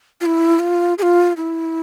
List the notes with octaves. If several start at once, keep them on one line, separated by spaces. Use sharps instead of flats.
F4
E4
F4
G#4
F4
E4